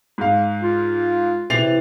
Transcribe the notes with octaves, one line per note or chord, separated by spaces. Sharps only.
G#2 F5
F4
C3 E3 A6 C7 F7